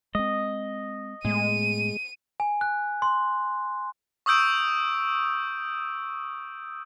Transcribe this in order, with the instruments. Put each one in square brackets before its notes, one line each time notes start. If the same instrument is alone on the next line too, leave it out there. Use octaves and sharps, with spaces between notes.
[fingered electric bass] G#3 C4 [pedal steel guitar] D#5
[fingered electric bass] A2 A3 B3 [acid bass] G#3 [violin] D#7
[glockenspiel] G#5
F#6
C6
[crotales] C#6 D#6 E6 G6 D7